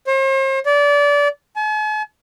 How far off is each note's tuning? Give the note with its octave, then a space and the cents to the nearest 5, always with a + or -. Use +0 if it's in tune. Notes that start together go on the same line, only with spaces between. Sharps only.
C5 +45
D5 -25
G#5 +45